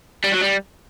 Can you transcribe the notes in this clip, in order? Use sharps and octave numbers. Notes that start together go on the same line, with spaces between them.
G3
F#3
G3